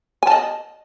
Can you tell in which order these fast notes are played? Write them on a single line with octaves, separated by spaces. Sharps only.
G#5 A5 D#5